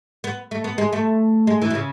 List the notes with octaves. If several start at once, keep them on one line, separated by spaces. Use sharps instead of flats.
B3
A3
B3
G#3
A3
G#3
E3
B2
C#3